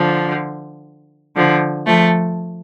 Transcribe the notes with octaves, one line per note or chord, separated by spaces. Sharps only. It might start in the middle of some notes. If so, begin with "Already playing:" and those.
Already playing: D3 F3
D3 F3
F3 A3